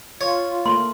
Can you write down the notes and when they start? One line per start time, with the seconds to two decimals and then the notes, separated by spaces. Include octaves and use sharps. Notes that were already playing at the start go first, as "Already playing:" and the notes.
0.21 F4 C#5
0.66 A3 A#3 C6